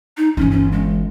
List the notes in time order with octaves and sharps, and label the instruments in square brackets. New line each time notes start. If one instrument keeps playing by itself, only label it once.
[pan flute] D#4
[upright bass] G1 E3 [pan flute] C#4
[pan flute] C#4
G#3